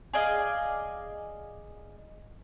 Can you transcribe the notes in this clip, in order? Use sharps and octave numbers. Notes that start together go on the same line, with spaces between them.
G#4 D5 D#5 F5